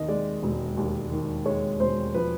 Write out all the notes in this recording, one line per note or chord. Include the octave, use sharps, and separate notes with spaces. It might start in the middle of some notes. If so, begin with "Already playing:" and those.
Already playing: D#2 D#3 D#5
G#3 D5
E1
D#2
D#3
G#3 C#5
E1 C5
F3 B4